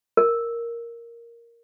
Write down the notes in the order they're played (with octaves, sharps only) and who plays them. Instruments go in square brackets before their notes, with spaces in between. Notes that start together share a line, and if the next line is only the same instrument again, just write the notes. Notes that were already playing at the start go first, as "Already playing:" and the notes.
[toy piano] A#4